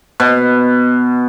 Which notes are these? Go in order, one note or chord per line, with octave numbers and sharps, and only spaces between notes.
B2